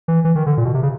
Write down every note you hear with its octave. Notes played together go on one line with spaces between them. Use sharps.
E3
E3
D#3
D3
A#2
B2
C3
C#3